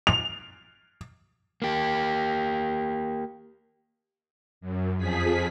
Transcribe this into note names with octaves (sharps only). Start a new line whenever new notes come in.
F7
A#3 G4
F#2
F2 F3 G#4 B6